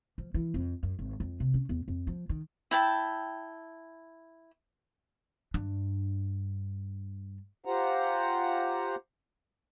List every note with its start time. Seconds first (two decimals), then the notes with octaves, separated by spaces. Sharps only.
0.18 F3
0.34 E3
0.54 F2
0.83 F#2
0.99 G#1
1.20 F2
1.40 C3
1.54 C#4
1.69 E2
1.88 F2
2.07 F3
2.29 D#3
2.71 E4 G5 A5
5.54 G2 D4
7.65 F4 G4 C5 F#5 A#5